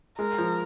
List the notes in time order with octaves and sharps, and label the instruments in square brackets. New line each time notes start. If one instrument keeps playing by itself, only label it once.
[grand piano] G#3 [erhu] A#4
[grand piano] F3